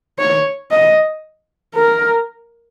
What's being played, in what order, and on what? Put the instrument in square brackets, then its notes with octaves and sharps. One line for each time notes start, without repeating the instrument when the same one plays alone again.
[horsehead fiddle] C#5
D#5
A#4